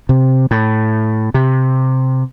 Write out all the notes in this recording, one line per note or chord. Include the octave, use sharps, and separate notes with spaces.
C3
A2
C3